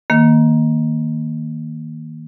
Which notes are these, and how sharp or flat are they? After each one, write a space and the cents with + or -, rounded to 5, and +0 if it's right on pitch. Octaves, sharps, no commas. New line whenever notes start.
D#3 +15 A#3 +0